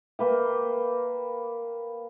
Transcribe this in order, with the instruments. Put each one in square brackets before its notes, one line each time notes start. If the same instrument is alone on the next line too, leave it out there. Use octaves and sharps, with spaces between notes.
[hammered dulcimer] A#3 B4 G5